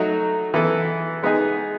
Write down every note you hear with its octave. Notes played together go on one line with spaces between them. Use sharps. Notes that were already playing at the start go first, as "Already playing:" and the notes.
Already playing: F#3 A3 D#4 F#4
E3 B3 E4 A4
G#3 B3 D#4 G#4